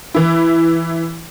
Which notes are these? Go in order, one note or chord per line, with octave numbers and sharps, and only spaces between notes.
E3 E4